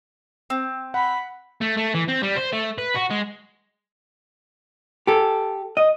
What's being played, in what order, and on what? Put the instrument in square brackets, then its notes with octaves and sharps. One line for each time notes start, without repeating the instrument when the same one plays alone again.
[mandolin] C4
[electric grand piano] F#5 [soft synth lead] B5
[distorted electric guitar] A3
A3
E3
C4
G3
C5
A3
B4
F#4
G#3
[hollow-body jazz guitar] G4 A4
D#5